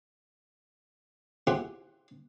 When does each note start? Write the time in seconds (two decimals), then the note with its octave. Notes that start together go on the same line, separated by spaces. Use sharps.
1.47 E4 F4 G4 G#4 C5 F#5